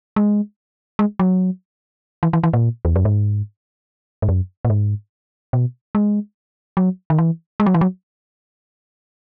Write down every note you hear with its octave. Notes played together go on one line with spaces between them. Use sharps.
G#3
G#3
F#3
E3
E3
E3
A#2
E2
F#2
G#2
G#2
F#2
A#2
G#2
B2
G#3
F#3
D#3
E3
G#3
F#3
E3
F#3